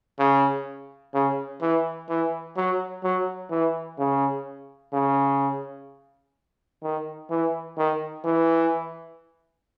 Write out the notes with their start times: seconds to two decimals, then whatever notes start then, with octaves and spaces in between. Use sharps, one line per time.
0.19 C#3
1.14 C#3
1.61 E3
2.09 E3
2.57 F#3
3.04 F#3
3.51 E3
3.98 C#3
4.93 C#3
6.83 D#3
7.30 E3
7.78 D#3
8.25 E3